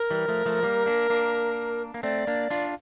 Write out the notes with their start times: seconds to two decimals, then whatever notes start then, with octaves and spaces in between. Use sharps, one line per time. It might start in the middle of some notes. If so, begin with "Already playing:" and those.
Already playing: A#4
0.11 E3 G3
0.28 F3 A3
0.45 F3 A3
0.63 G3 A#3
0.86 A#3 D4
1.10 A#3 D4
1.94 A#3
2.03 A3 C4 D5
2.27 A#3 D4
2.50 D4 F4